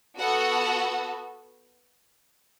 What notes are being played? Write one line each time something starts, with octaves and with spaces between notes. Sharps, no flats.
B3 F#4 A4 F#5